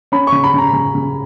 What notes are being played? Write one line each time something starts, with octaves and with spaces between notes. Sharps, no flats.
C#4 B5
C#6
C#3
B5
C#3 A#5
C#3
C#3